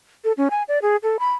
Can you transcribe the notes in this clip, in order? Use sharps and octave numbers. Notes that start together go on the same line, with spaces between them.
A4
C#4
G#5
D5
G#4
A4
B5